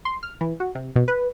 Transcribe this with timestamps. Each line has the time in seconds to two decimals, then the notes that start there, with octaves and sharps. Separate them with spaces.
0.05 C6
0.23 F6
0.41 E3
0.60 F#4
0.75 C3
0.96 B2
1.08 B4